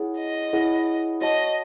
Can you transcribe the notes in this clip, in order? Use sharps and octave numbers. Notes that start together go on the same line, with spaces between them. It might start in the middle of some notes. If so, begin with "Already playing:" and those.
Already playing: E4 G#4 C#5 F#5
D#5
E4 G#4 C#5 F#5
F#4 C#5 D#5 F#5 A5